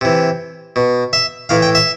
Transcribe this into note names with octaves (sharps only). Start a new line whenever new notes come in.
C3 E3
B2
E5
A2 E3 F5
G5
E5